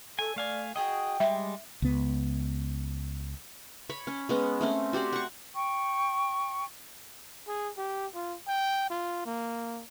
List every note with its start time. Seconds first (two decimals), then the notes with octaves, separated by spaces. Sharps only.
0.19 A4 G#5
0.36 A3 D5 F5 G#5
0.76 F#4 G#4 D#5 G5
1.20 G3 G#3 E5
1.82 C#2 B3
3.90 C#5 B5
4.07 C#4
4.29 G#3 B3 C#4
4.61 A3 C4 C#4
4.93 F#4 G4 C5 D5
5.13 F#5 C#6
5.55 G5 C#6
7.48 G#4
7.77 G4
8.15 F4
8.47 G5
8.90 F4
9.26 A#3